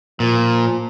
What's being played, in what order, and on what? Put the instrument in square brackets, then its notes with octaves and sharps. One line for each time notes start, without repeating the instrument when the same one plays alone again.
[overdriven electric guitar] A#2 [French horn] F3